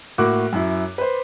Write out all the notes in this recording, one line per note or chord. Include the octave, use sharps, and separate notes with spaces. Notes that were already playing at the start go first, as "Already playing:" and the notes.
A2 A#3 F#4 D6 F#6
F#2 E4
B4 C5